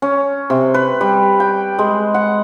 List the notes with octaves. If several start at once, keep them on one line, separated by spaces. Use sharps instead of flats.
C#4
C3
B4
G3
G5
G#3
F#5